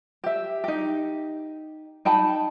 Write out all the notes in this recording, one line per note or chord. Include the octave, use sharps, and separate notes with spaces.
G4 E5
D#4 G4
D#4 G5 A5 B5